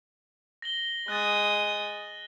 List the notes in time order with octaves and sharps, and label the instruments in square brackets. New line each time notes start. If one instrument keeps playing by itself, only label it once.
[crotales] A#6 F#7 G7
[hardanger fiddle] G#3 D#6 [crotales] F#6 A6